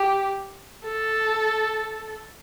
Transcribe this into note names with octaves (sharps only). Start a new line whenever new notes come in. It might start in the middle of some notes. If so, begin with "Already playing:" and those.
Already playing: G4
A4